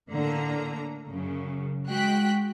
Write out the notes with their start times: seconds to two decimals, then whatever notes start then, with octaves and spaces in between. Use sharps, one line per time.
0.11 A2 D3 A#3 A#5
1.08 F#2 C#3
1.86 G#3 F#4 G5 F#6 B6